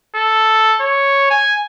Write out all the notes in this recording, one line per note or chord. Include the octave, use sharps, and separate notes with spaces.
A4
C#5
G#5